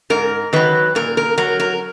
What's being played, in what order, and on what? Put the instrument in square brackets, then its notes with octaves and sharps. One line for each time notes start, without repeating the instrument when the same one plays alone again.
[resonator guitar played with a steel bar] G#2 A#4
D#3 F#3 B4
A#2 A#4
A#4
F#3 A#4
A#4